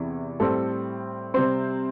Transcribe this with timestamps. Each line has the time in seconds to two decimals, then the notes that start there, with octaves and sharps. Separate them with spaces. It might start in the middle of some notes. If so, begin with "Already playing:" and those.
Already playing: E2 C3 E3
0.40 A2 G3 C4 A4
1.34 C3 G3 C4 C5